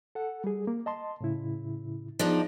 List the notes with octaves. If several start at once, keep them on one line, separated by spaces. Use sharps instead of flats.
A4 F#5
G3 G#4
A#3
D#5 A5 C6
A2 C#3 E4
F3 B3 D4 D#4 G#4